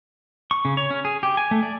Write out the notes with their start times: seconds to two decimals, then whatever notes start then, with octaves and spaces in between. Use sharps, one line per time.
0.51 C#6
0.65 C#3
0.77 C#5
0.90 C#4
1.05 G#4
1.23 G4
1.37 G#5
1.51 A3
1.63 D5